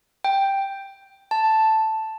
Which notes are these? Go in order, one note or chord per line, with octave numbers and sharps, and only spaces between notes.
G5
A5